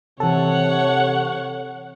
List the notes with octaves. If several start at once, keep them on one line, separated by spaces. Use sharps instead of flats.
C3 E3 A4 C#5 F#5